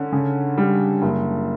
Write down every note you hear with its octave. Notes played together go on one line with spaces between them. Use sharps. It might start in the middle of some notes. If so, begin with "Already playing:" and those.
Already playing: D3 C#4
C#3
G3
F#1